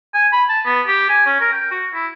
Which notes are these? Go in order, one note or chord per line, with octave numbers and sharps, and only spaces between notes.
G#5
B5
A5
B3
G4
G#5
C#4
A#4
G5
F#4
E4